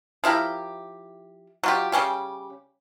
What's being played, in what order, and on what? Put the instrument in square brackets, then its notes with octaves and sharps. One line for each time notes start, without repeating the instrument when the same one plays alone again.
[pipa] F3 E4 G4 A#4
F#3 F4 G4
C#3 G3 C#4 G4